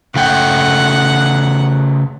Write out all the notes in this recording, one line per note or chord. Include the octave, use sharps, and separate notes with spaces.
C#3 A3 F#5 G5